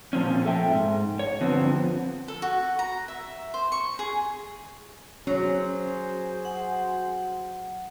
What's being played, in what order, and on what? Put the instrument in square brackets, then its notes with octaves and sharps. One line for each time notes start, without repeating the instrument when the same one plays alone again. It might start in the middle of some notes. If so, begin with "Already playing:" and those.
[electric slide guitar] A#2 F3 C4 C#4
A4 E5 G5
G#2
C#5
G2 D3 F3 B3 C4
[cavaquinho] A4
F#4
A#5
E5
C5
C#6
G#4
[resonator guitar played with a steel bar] F#3 [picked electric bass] C#4 [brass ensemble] F#4 G#4 C5
[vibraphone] F#5